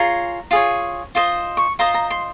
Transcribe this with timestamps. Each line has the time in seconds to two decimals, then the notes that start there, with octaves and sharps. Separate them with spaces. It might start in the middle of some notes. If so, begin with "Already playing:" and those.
Already playing: F4 G#4 C#5 A#5
0.51 F4 G#4 C#5
1.15 F4 C5 D#5
1.57 C#6
1.79 F4 C5 D#5 A#5
1.94 A#5
2.11 C6